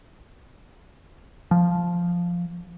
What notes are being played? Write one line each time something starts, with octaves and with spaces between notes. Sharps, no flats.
F3